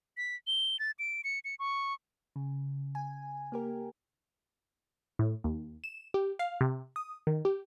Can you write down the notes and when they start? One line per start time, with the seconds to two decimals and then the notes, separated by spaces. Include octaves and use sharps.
0.17 B6
0.47 G7
0.79 A6
0.99 D7
1.24 C#7
1.45 C#7
1.59 C#6
2.36 C#3
2.95 G#5
3.52 A#3 G4 A#4
5.19 A2
5.44 D#2
5.84 E7
6.14 G4
6.39 F5
6.61 C3
6.96 D#6
7.27 D#3
7.45 G4